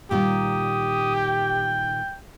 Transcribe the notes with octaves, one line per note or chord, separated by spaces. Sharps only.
A#2 D#3 G3 G4 D#6
G5